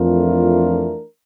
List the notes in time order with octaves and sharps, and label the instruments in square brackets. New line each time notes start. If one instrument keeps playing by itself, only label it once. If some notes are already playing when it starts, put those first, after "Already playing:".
Already playing: [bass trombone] F2 [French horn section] E3 A3 D4 F4 A#4